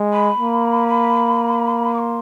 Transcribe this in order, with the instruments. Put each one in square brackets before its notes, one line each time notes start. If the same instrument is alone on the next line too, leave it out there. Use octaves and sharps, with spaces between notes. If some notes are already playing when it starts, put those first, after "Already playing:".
Already playing: [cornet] G#3
[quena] B5
[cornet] A#3
[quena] D6
C6